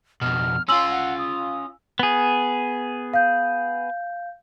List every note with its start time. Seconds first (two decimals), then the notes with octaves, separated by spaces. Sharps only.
0.21 F2 B2 F6
0.69 C#4 F4 C6 E6 F#7
0.91 F#5
1.19 D#6
1.99 B3 G#4
3.14 F5 G6